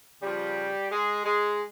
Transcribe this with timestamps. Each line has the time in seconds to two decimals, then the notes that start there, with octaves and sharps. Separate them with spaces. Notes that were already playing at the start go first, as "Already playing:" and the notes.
0.22 C#3 F3 G3 G4
0.92 G#3 G#4
1.26 G#3 G#4